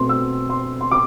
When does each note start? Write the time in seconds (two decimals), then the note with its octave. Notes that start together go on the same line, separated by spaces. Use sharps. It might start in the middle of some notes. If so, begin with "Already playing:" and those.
Already playing: B2 A3 C4 C6
0.09 E6
0.50 C6
0.81 C6
0.91 D6